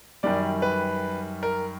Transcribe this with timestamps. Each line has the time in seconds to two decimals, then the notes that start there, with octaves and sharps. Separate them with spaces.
0.23 F#2 D#3 G3 D5
0.62 B4
1.43 A#4